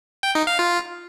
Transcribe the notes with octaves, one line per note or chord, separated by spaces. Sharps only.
G5
D#4
F5
F4